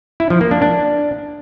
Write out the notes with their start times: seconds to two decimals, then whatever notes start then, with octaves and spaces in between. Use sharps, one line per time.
0.20 E4
0.30 F3
0.41 A#3
0.51 D4
0.62 D4